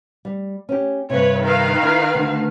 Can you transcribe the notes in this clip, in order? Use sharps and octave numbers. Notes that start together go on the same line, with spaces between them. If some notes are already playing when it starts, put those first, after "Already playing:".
G3
C#4 G4
G2 C3 B4 C#5
D#3 B4 F5
E4
D2 D3 A3